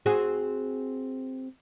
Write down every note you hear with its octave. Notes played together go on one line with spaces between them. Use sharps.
C4 F#4 G#4